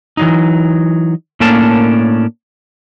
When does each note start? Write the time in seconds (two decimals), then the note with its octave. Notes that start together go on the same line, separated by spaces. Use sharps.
0.17 E3 F#3 D#4
1.40 A2 A#3 C#4 D4 A#4 A5